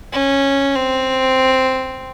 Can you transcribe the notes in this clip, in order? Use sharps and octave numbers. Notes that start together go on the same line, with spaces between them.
C#4
C4